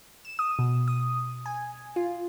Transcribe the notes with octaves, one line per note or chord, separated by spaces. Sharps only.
E7
D#6
B2
D#6
G#5
F4